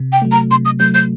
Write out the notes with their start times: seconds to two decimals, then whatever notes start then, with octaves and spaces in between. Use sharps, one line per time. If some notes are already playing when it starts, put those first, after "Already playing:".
Already playing: C3
0.12 G5
0.22 F#3 A3
0.32 A#5
0.51 C3 C6
0.65 D#6
0.79 F#3 A3 G6
0.94 G6